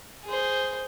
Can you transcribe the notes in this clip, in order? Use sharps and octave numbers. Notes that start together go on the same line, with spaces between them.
G#4 C5